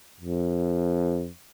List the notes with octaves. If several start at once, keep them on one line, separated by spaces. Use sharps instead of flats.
F2